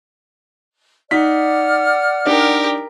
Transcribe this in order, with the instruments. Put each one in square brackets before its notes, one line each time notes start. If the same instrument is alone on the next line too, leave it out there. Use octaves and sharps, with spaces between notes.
[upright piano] D#4 B6 [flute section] D5 F#5 F6
[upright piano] D4 D#4 [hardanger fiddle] G4 A#4